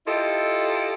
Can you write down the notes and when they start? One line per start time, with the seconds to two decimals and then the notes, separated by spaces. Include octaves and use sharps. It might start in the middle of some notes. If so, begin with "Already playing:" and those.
0.07 E4 F4 G4 A4 D#5